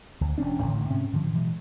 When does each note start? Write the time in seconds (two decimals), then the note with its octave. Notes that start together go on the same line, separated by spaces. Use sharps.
0.21 D2
0.38 E1 C#4 D4
0.62 A1 A2 D3 D#3
0.87 G#2 C3 C#4
1.13 A2 D3 D#3 F3
1.33 B2 E3 F#3 G#3